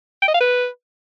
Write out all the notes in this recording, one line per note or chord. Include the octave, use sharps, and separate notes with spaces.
G5
D#5
F5
B4